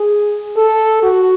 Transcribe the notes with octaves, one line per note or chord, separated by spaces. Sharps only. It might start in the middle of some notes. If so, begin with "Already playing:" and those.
Already playing: G#4
A4
F#4